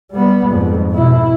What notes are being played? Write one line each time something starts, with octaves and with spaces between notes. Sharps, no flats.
G3 B3
F2 G#2
B2 E4